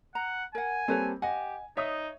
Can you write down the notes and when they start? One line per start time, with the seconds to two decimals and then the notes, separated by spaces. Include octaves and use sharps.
0.15 F#5 A#5
0.55 A#4 F#5 G#5
0.88 G3 A#3 C4 A4 B4 C#5
1.22 G4 D#5 F#5 G#5
1.77 D#4 C#5 E5 D#6